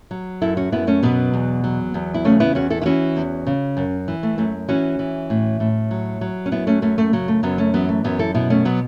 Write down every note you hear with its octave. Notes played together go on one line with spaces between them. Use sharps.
F#3
F#2 E4 A4
C#4 F#4
F#2 B3 E4
A3 C#4
B2 F#3 B3
E2
F#3
E2
E4
C#3 A3 C#4
B3 E4
E2 C#4 F#4
E4 A4
E4
E3 C#4 F#4
E2
C#3
F#2
E3
A3
F#2 A3
E3 C#4 F#4
E3
A2
A2
F#3
F#3
C#4
F#2 B3 E4
A3 C#4
F#2 A3 C#4
A3
C#3 F#3
A3
F#2 F#3 B3
A3 C#4
E3 F#3 B3
A3
F#2 F#3 B3
E4 A4
B2 B3 E4
A3 C#4
F#3 B3